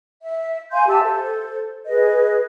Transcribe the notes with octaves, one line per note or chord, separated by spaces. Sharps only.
E5
F5 G#5 C6 G6
G4 E5 A5 E6
A4 C5
G#4 B4 D#5